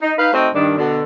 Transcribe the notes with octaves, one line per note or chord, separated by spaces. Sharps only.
D#4
D#4 B4 F5
A3 C4 D#4 F#4 C5 D#5
G2 D#3 D4
B2 D3 D4